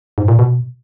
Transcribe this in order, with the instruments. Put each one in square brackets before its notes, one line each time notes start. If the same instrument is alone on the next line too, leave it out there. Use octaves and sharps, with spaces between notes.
[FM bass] G#2
A#2
B2